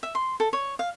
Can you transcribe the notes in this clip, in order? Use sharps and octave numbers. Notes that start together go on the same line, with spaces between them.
E5
C6
A4
C#5
F5